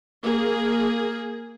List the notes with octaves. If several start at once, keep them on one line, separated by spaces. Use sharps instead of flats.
A#3 G#4